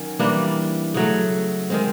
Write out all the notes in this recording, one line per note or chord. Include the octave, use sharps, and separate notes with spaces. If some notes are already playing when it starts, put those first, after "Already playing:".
Already playing: D#3 F#3 C#4
E3 G3 A#3 D4
C#3 F#3 A3
D#3 G#3 C4